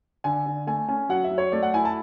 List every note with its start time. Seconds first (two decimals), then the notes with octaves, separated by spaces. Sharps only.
0.24 D3 G#5
0.46 D3
0.67 A3 G#5
0.88 C#4 G#5
1.09 F#3 F#5
1.24 E5
1.31 F#3
1.38 C#5
1.52 A3 D5
1.63 F#5
1.74 E4 G#5
1.85 A5